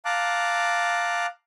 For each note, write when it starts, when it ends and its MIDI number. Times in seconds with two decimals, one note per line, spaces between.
0.05 1.26 77
0.05 1.26 81
0.05 1.26 82
0.05 1.26 86
0.05 1.26 90